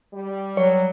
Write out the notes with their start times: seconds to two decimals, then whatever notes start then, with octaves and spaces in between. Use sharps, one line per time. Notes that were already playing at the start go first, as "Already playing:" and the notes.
0.13 G3
0.57 F#3 C#5